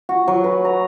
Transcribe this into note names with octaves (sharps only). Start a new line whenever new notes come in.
F#4
F#3
B4
A#5